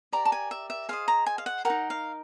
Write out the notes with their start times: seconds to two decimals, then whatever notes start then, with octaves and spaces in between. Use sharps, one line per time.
0.13 G4 A#4 D5 A#5
0.25 A5
0.32 G#5
0.51 E5
0.70 E5
0.89 G#4 C5 D#5 F5
1.08 A#5
1.26 G#5
1.38 F5
1.46 F#5
1.65 G4 A#4 F#5
1.70 D#4
1.90 F5